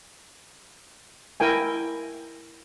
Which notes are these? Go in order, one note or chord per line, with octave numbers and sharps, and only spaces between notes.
E4 A#4 G5 G#5